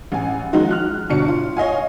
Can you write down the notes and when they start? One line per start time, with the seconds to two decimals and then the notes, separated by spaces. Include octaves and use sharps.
0.12 A1 G#5
0.53 D#3 F3 G#3 D#4 F4 F#4
0.71 F6 F#6
1.10 G1 B2 D4 C#7
1.28 F4
1.57 C#5 D#5 F5 G#5